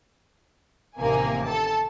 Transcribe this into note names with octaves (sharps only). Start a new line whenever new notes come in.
A1 C3 D#3 A#3 G#5
A4 A5